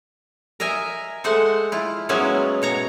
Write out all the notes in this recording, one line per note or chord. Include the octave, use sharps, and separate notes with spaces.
A#4 D#5 E5 G#5
G#3 A3 C5 F#5
E4 F4
F#3 G#3 A#3 B3 C#4 E4
B2 C#5 A#5